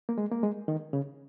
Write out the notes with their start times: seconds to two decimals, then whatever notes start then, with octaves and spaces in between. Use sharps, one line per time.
0.09 A#3
0.18 G#3
0.32 A#3
0.43 G#3
0.68 D#3
0.93 C#3